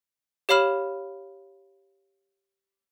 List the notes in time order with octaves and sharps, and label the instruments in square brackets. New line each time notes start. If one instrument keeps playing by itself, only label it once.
[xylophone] G4 C#5 F5 B5 F6 E7